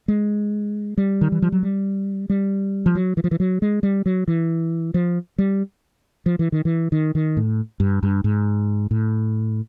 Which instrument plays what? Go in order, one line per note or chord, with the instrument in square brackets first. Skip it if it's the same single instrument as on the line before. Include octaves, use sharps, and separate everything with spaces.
[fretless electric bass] G#3
G3
D#3
E3
F3
F#3
G3
G3
F3
F#3
E3
F3
E3
F#3
G#3
G3
F#3
E3
F3
G3
F3
E3
D#3
E3
D#3
D#3
A2
G2
G2
G#2
A2